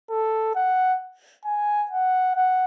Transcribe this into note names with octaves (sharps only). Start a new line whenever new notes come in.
A4
F#5
G#5
F#5
F#5